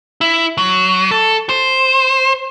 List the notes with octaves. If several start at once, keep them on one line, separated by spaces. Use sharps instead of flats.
E4
F#3
A4
C5